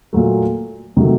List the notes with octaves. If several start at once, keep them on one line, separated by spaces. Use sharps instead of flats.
A#2 F#3 A3
C3 D#3 F#3 A3